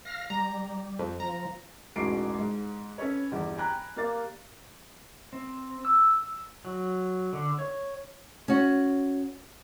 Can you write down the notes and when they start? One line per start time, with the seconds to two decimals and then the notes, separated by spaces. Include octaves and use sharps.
0.05 F5 F6 A#6
0.30 G3 A#5
0.99 F2
1.20 F3 A#5
1.96 E1 A1 G#2 F#4 C7 D7
2.39 G#2
2.98 C#4 A4 B4 C#5
3.32 G1 E2 G3
3.58 G5 G#5 A#5 B5 F#6
3.96 A#3 G4 D5 F5 A6
5.33 C4
5.85 E6
6.65 F#3
7.33 D3
7.59 C#5
8.48 C#4 F#4